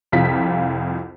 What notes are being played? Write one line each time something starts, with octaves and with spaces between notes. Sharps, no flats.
C2 F2 F4 B6